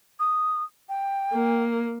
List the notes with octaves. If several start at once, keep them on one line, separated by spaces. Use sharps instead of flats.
D#6
G5
A#3